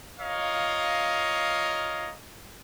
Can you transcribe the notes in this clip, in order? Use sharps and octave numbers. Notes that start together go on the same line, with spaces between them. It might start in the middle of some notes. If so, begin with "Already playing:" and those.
F4 A#4 C#5 D#5 F5